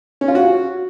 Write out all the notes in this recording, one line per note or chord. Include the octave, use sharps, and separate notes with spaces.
C#4
F4
F#4